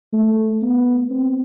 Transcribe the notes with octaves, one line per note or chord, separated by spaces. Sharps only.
A3
B3
C4